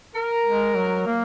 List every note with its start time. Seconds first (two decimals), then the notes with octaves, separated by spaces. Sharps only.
0.15 A#4
0.46 G#3
0.76 F#3
1.06 A#3